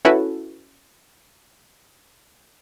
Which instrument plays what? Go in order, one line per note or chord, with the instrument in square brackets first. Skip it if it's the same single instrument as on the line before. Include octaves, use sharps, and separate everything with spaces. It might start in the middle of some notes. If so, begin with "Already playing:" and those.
[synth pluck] C#4 E4 F#4 A4 B4